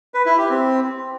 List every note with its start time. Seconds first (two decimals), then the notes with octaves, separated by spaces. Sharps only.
0.14 B4
0.26 E4
0.38 G4
0.50 C4